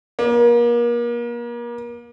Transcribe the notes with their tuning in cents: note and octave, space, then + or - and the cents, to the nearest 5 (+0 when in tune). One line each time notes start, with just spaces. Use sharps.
A#3 +35